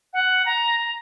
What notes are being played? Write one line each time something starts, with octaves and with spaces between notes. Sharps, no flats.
F#5
A#5